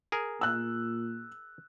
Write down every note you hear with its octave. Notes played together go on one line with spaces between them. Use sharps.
G#4 A#4
A#2 E6 F#6